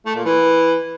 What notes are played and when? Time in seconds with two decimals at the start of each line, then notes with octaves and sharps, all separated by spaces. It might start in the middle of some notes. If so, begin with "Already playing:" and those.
0.06 A3
0.16 A#2
0.25 E3